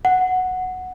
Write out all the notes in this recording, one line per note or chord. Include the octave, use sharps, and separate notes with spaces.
F#5